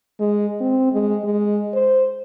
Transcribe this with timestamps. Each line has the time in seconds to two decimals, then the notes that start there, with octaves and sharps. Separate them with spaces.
0.20 G#3
0.61 C4
0.91 G#3
1.24 G#3
1.74 C5